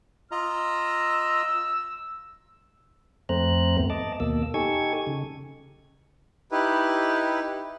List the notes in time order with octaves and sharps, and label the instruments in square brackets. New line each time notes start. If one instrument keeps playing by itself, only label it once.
[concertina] F4 D#5 A#5 [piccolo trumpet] E6
[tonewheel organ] F2 A3 C4 C5 A#5 F#6
D#2 G#2 A3 B3
D#5 A5 D6
D#2 B2 A#3 E6
D#4 G4 A4 G#5 C#6 G#6
C#3
[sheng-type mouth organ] D#4 E4 G4 B4